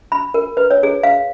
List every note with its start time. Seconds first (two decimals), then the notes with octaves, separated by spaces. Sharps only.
0.12 B5
0.34 A#4
0.57 B4
0.71 C#5
0.83 G#4
1.03 F5